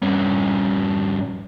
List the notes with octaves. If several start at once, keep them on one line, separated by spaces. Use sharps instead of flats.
G2 C#4